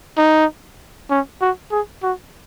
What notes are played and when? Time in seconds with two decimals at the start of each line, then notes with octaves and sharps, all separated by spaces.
0.18 D#4
1.10 C#4
1.41 F#4
1.72 G#4
2.03 F#4